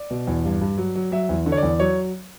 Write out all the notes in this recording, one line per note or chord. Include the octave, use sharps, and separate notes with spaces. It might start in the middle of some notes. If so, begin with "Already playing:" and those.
Already playing: D5
B2
E2
G2
G2
F#3
F#3
F#3 E5
E2
D3
C#5
D5
E2
F#3 C#5